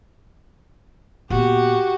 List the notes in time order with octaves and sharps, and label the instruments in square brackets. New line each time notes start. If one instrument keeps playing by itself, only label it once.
[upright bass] A#2 B3 [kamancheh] F#4 [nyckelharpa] G4